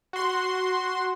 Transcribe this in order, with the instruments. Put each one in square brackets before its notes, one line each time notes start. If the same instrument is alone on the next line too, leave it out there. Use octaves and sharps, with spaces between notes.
[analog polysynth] F#4 C6